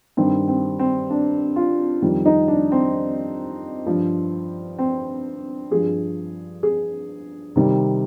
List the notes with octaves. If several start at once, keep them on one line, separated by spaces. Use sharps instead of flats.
G2 D#3 G3 C4
C4
C4
D4
F4
F2 D#3 G3
D#4
D4
C4
G2 F3
C4
G2 F3 G#4
G#4
C3 D#3 G3